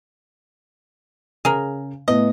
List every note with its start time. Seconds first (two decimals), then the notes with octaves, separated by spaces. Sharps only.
1.45 C#3 G#4 A#4
2.08 A2 A3 B3 D#5